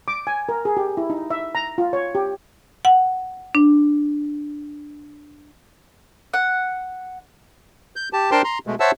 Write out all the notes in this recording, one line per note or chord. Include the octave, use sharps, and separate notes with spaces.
D6
G#5
A#4
G#4
G4
E4
D#4
E5
A#5
F4
C#5
G4
F#5
D4
F#5
G6
G4 A5
D4 A#4 C5 G5 A5 C6
A#5 C6
B2 G#3 A3
C5 C#5 E5 F#5 A5 E6